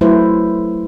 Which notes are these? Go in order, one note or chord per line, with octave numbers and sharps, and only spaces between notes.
F#3 A3 E4 B4 C5